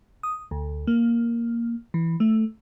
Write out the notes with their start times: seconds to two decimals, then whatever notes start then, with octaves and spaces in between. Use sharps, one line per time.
0.23 D#6
0.51 D2
0.87 A#3
1.94 E3
2.20 A3